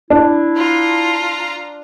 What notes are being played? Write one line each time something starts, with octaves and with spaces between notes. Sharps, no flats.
D4 E4
F4 A#5